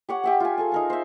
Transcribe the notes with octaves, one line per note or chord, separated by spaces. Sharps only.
G4 C#5 F#5
G4 E5 G5
F4 G#5
G#4 A4 G#5
D#4 A#4 G#5
C5 E5